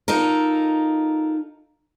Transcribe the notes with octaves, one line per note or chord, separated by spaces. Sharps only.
D#4 F4 A4 A#4